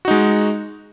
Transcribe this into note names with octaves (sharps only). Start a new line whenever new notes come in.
G#3 D#4 F#4